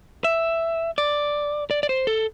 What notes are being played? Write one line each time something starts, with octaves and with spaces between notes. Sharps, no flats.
E5
D5
D5
D5
C5
A4